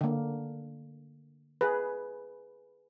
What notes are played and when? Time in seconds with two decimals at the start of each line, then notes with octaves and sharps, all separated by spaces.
0.01 D3 A#3
1.61 G#4 B4